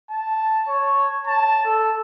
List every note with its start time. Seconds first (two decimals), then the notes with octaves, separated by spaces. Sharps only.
0.11 A5
0.68 C#5
1.27 A5
1.65 A4